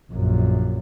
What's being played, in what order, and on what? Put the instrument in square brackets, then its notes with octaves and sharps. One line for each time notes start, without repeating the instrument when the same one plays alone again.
[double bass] A#1 F#2